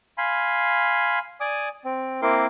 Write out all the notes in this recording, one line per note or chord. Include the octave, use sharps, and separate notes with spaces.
F5 G#5 B5 C6
D5 G#5 D6 D#6
C4
A#3 C4 E4 A#4 C6 D6